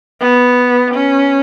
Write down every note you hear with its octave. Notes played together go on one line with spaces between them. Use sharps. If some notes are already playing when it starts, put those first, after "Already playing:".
B3
C#4